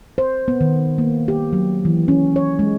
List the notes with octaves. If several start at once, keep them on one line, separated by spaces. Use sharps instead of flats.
C5
B3
D#3
A#3
G4
F#3
E3
C#4
C#5
G#3